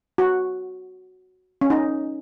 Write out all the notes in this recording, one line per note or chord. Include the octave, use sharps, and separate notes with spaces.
F#4
C#4
D#4